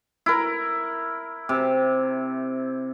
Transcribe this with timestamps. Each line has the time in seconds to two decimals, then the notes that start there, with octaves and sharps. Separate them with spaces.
0.26 E4 A#4
1.49 C3